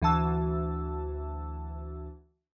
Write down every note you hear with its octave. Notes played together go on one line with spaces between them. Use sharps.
D2 E3 F#4 A5 E6